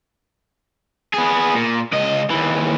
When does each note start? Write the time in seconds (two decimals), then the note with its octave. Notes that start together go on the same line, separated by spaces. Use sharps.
1.14 B3 G#4
1.55 A#2
1.93 C#2 D#5
2.30 D#2 E3